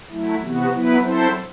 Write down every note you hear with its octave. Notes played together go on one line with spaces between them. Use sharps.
F#3 A3 E4
C3 E3 B3 F#4
F#3 B3 E4 B4
F#3 C4 E4 A4 C5